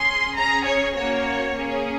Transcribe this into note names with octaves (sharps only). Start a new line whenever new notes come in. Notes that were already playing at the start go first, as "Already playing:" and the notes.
Already playing: C#4 G#4 C6
C#4 G#4 A#5
C#5
A#3 C#4 F#4 C#5
A#3 C#4 G#4